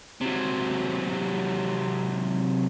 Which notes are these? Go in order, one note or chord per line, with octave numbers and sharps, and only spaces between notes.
C3 F#3